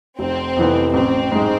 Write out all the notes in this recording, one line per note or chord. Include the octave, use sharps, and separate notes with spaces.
F1 C4
F2 C3 E3 B3
A1 C4
G#2 G#3